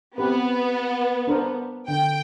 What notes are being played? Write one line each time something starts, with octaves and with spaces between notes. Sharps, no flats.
B3 C4 G4 B4
D4 A#4 C5
D3 G5